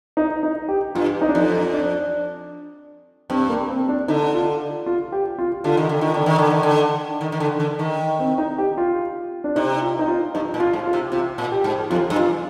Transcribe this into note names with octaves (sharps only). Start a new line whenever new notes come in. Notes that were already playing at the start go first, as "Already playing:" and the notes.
D#4
D#4
G4
G2 F4
D#4
D4
F2 D#4
D4
G2 C4
A#3
C4
D4
D3 D#4
F4
F4
G4
F4
D3 F4
D#3
D3
D#3
D3 D4
D#3
D3
D#3
D3
D#3
D#3
D3
D3
D#3
C4
D#4
G4
F4
D4
C3 D#4
F4
D#4
F4
G2 D#4
A#2
F4
G#2
F4
C3
C3 F4
A#2
G4
G#2
F2 F4
G2
F4